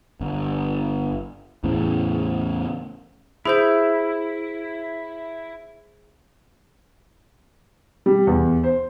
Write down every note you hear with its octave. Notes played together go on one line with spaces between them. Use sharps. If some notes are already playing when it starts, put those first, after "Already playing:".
G1
E2 A2 C#3
E4 G#4 C5 G6
G3
E2
C5